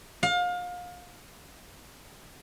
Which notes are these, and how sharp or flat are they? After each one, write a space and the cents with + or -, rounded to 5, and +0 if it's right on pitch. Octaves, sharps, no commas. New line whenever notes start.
F5 +30